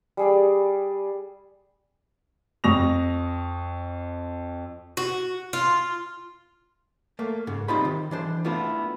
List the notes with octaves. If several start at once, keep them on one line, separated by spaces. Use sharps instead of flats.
G3 G#4 D5
F2 C#6 D#6 A#6 F7
F#4
F4
A3 A#3
G#2 C#3
C2 C3 D#4 F4 C5 B5
D#3
E3 D4 C5
A3 B3 D4 E4 F4